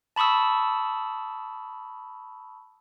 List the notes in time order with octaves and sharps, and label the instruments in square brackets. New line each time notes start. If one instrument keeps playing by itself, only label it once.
[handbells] A5 B5 C#6 D#6 E6